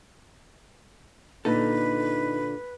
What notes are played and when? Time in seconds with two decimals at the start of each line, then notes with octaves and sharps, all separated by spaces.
1.45 A#2 D3 D#4 A4 B4